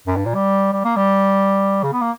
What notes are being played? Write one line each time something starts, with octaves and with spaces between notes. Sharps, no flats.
F#2
G2
A#2
G3
G3
A#3
G3
C#3
B3
A#3